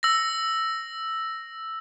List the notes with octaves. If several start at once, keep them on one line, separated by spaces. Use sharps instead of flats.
E6 A#6